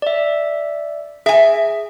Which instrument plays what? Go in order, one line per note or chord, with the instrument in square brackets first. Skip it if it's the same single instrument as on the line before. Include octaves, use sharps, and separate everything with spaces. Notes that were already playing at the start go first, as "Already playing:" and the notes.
[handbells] D5 E5
[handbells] G#4 [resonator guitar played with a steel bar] E5 G#5